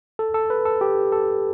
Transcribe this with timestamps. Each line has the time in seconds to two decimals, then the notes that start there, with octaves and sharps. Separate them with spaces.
0.19 A4
0.34 A4
0.50 B4
0.65 A4
0.81 G4
1.12 A4